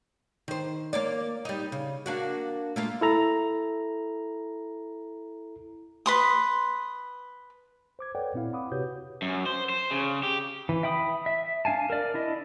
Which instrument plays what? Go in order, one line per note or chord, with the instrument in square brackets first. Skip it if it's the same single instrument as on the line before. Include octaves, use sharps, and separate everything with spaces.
[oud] D#3 C5
A#3 C#5 D5
G3 D#4
C#3
A#3 D4 F#4
A3 A#3 F4
[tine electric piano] E4 A4 A#5
[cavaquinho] B4 C6 D#6
[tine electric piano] C5 D6 G#6
A4 B4 C#5 D5 F#5 G5
A#2 C4 E4 F5
F#5 B5 D6 D#6
C3 F#4 G4 B4 C#5 G6
[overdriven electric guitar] F#2
C5
C5
C#3
G4
[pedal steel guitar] E3
E5 G5 B5 D#6
E5
D4 F5 G#5 A5
A#4 D5
D4 E4 D#5